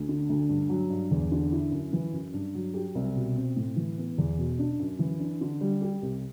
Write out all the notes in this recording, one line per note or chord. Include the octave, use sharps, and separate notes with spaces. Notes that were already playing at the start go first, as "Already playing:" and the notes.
Already playing: D2
D3
D2
G2
F#3
G2
E2
D3
E4
F#2
E3
F#2
G2
F#3
G4
C2
B2
C4
A2
E3
B3
E2
B2
D4
F#2
E3
D4
D3
G3
G4
C2